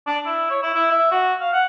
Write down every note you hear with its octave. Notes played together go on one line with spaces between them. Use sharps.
D4
E4
C#5
E4
E4
E5
F#4
F5
F#5